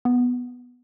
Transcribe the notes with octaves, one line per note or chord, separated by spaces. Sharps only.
B3